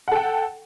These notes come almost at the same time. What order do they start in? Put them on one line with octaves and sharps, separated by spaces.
F#5 A4 G5